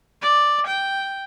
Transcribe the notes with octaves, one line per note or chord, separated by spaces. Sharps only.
D5
G5